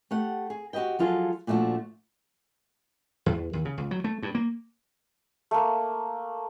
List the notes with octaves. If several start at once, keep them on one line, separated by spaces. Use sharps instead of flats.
A3 G4 F#5
G#4
F#4 G4 B4 D#5 G5
F3 F#3 F4 G#4 A4
A#2 F3 A3 D4 F#4
E2
D#2
C#3
C#2
F#3
A3
G2
A#3
A3 A#3